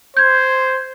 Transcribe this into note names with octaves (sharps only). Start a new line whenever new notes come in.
C5 G6 G#6